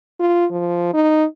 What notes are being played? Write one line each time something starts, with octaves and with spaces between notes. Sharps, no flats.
F4
F3
D#4